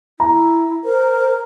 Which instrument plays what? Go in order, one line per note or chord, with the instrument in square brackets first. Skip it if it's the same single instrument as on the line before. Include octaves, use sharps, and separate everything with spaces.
[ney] E4 [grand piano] A#5
[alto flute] A#4 [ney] C5